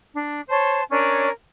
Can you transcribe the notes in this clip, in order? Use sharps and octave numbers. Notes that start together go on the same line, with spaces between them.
D4
C5 C#5 A5 C6
C#4 D4 A#4 C#5